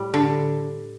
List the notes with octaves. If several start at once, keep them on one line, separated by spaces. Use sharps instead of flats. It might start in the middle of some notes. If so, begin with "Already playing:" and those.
Already playing: A2 G3
D3